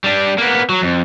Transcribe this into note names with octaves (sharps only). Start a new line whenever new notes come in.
G3 D4
A#3 B3
F#3
F2